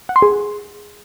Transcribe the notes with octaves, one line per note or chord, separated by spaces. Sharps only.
F#5
C6
G#4